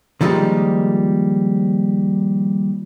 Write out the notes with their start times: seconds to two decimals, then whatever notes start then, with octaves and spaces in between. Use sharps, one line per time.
0.21 D3 D#3 F3 G3 G#3 A#3